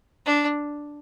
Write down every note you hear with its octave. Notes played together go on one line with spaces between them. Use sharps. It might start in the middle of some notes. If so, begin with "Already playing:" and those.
D4